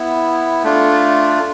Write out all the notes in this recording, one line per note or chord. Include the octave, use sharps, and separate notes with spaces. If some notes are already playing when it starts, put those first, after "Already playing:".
Already playing: B3 E4
A3 D4 F4